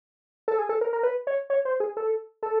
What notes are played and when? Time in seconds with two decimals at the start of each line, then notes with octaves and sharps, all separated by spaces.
0.48 A4
0.58 G#4
0.69 A4
0.81 A#4
0.93 A#4
1.03 B4
1.27 C#5
1.50 C#5
1.65 C5
1.80 G#4
1.97 A4
2.43 A4